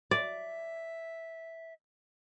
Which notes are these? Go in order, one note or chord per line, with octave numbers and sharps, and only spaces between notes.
D5 E5